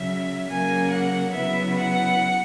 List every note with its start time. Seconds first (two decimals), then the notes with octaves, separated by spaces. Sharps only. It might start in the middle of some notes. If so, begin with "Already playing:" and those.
Already playing: C#3 F#3 C#4 E5
0.49 C#3 F#3 A#3 C#4 G#5
0.91 F#5
1.33 C#3 F#3 B3 E4 E5
1.76 F#5